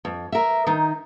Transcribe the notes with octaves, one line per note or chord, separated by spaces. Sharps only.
F2
A#4 E5
D#3 D#4